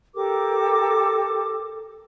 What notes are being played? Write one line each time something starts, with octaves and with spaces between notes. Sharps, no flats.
G4 A4 A#4 D6